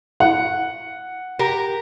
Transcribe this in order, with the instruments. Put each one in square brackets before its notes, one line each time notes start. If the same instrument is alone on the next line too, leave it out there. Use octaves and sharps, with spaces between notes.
[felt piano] F#5
[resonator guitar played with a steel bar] G4 A#4